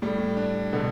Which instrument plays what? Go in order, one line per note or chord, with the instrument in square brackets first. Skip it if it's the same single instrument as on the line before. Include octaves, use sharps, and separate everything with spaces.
[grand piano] A2 [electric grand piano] G3
[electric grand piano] D4
[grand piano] B2 [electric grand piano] D3